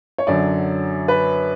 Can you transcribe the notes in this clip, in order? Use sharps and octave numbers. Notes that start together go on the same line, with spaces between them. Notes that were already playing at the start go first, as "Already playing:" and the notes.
C#5
F#2 D3 F#3 D5
B4